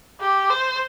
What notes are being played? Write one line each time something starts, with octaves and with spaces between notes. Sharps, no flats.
G4
C5